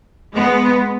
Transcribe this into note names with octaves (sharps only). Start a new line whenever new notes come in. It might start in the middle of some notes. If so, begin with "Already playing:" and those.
G#3 B3